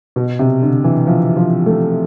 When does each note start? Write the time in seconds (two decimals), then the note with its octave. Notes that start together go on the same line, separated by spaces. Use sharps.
0.16 B2
0.39 C3
0.62 D3
0.84 E3
1.07 F3
1.37 F3
1.66 A3